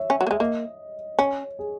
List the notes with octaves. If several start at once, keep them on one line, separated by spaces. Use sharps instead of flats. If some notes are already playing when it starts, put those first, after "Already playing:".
Already playing: C#5 E5
C#4
F#3
A#3
G#3 E5
A#3 D#5
C#4 C#5
G#4